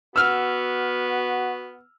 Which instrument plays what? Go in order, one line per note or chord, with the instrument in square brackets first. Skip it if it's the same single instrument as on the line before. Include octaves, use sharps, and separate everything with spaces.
[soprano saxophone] B3 [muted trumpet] F#4 [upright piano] E6 F6